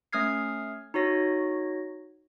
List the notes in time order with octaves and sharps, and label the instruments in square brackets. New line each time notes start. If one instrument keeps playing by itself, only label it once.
[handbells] A3 C#4 D#6 F6 G#6 C7
D#4 F#4 C#5 A#6